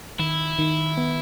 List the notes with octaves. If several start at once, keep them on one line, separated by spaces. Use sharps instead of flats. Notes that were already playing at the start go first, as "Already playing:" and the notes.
D#3 E4
D#3
B3